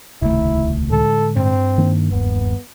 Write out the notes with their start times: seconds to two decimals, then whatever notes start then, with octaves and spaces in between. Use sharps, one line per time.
0.22 D#1 C#2 C3 D#3 A3 E4
0.91 A2 D3 G#3 A4
1.36 G2 G3 C4
1.78 D#3 A#3 D4
2.11 F1 D#2 B3